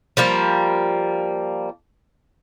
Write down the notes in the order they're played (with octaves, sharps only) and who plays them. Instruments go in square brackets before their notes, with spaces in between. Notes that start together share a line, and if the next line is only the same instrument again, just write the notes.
[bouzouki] F3 G3 A#3